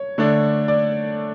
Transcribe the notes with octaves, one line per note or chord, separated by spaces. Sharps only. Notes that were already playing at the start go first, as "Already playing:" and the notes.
Already playing: C#5
D3 A3 D4
D5